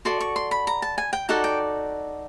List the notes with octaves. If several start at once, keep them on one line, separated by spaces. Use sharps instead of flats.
F#4 A4 D5 C6
C#6
C6
B5
A#5
A5
G#5
G5
D#4 F#4 A4 D5 F#5
G5